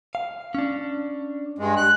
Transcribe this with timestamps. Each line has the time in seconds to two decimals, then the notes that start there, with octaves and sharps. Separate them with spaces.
0.15 F5
0.55 C#4 D4
1.58 G2 G#3
1.77 F#6